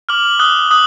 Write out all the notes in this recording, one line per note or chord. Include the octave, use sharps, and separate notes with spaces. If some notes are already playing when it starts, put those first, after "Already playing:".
D6 F6 F#7
D#6 F#6 G7
D#6 F#6 F#7